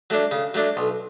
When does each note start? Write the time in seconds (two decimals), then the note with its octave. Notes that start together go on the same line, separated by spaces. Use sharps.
0.10 F#3 A3 D4
0.31 C#3
0.54 F#3 A3 D4
0.77 B1